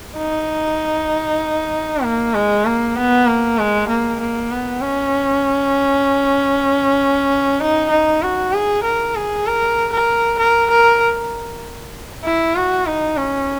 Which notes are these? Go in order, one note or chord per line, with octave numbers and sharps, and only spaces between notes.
D#4
A#3
G#3
A#3
B3
A#3
G#3
A#3
A#3
B3
C#4
D#4
D#4
F#4
G#4
A#4
G#4
A#4
A#4
A#4
A#4
E4
F#4
D#4
C#4